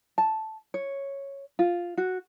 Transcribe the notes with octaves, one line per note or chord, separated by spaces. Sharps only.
A5
C#5
F4
F#4